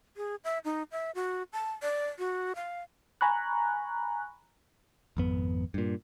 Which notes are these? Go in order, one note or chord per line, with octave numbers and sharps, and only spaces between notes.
G#4
E5
D#4
E5
F#4
A5
D5
F#4
F5
G#5 A#5 B5 C#6 F#6
G#1 F2 B3
G2 A#2